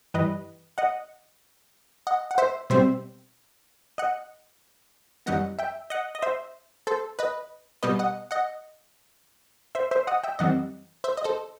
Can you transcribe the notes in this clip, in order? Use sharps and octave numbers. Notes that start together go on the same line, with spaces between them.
G2 E3 G3 B4 D#5
D#5 F#5
D#5 F#5
F#5
C5 E5
B2 G3 C4 C5 E5
D#5 F#5
F#2 E3 G3 B3 D#5 F#5
E5 G5
D#5 F#5
D#5
C5 E5
A4 C5
B4 D#5
B2 G3 B3 B4 D#5
D#5 F#5
D#5 F#5
C5 E5
C5 E5
D#5 F#5
E5 G5
F#2 E3 G3 C4 D#5 F#5
C5 E5
D#5
A4 C5